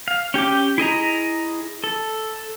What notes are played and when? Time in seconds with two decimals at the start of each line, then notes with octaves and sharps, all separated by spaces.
0.08 F5
0.34 C#4 G4 G5 D6
0.78 E4 G#4 D#5 A#5
1.84 A4